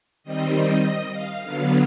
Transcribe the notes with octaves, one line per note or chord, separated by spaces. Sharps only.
D#3 G3 C4 D#5
D#5
D#5
F5
D3 F#3 B3 F5